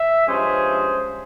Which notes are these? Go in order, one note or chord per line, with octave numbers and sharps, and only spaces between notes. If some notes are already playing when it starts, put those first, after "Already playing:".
Already playing: E5
G2 F3 G#3 C#4 G#4 C5